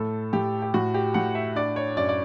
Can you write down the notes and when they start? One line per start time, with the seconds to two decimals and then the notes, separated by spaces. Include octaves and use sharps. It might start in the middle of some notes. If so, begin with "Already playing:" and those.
Already playing: A2 A4
0.33 A2 G4
0.62 G4
0.74 A2 F#4
0.94 G4
1.14 A2 F#5
1.35 E5
1.56 D4 D5
1.76 C#5
1.96 F#2 D5
2.09 D5